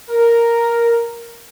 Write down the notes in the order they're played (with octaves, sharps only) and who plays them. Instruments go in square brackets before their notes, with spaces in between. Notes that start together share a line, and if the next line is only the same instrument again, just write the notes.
[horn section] A#4